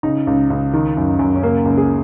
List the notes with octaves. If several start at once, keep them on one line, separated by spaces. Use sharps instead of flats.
C#3 D#4
C#2
C#2
D#3
F#2
F#2
C#4
C#3 A#3
C#2
G#4